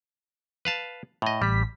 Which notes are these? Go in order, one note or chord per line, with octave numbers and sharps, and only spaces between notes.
B4 F5 A5
A2 D#5
A1 G3 B6